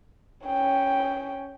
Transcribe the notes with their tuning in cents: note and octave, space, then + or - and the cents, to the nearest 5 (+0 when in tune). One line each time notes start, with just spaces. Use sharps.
C#4 +0 G5 +0